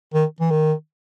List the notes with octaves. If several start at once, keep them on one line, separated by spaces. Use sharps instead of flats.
D#3
E3
D#3